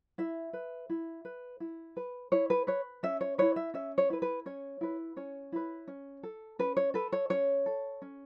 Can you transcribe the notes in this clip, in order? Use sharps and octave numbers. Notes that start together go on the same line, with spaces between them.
E4 E5
B4
E4
B4
E4
B4
E4 C#5
B4
B4 C#5
C#4 E5
C#5
E4 B4 C#5
E5
C#4 E5
C#5
E4 B4
B4
C#4 C#5
E4 B4
C#4 C#5
E4 B4
C#4
A4
C#4 B4
C#5
A4 B4
C#5
C#4 C#5
A4
C#4